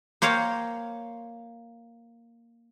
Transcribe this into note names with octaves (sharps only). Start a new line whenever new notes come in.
A#3 C5 C#5 F5 G5